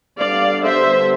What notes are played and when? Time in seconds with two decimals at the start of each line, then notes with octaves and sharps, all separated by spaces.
0.19 D3 G3 B3 D5 F5
0.63 C5 E5